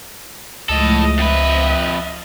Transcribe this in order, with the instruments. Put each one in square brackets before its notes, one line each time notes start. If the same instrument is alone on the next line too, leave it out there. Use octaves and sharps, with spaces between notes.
[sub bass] C#2 [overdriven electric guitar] A2 A4 [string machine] F3 G#3 A3 [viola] D#5
[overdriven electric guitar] F2 B4 [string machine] C5 [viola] D#5 E5
[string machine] F5 A6